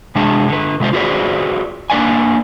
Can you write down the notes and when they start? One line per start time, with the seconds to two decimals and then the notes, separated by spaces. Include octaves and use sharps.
0.15 C3 G#3 D4 G#4 A5
0.48 D3 B4
0.80 C3 G#3 F4 C5
0.93 F4 F#4 G#4 B4 C5 D5
1.90 A#3 D4 B4 D5 F5 G#5